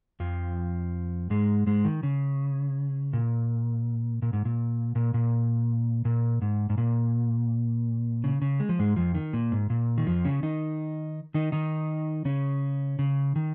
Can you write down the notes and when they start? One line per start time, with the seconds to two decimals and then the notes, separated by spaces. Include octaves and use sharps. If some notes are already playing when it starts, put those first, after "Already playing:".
0.20 F2 F3
1.30 G#2 G#3
1.66 G#2 G#3
1.85 D#3
2.03 C#3
3.13 A#2
4.22 A#2
4.33 G#2
4.45 A#2
4.95 A#2
5.14 A#2
6.05 A#2
6.42 G#2
6.70 G#2
6.78 A#2
8.24 C#3
8.42 C#3
8.60 G#3
8.69 F3
8.79 G#2 G#3
8.96 F2 F3
9.15 D#3
9.33 A#2
9.52 G#2
9.70 A#2
9.98 D#3
10.07 F2 F3
10.25 C#3 C#4
10.43 D#3 D#4
11.34 D#3 D#4
11.52 D#3 D#4
12.25 C#3 C#4
12.99 C#3
13.36 D#3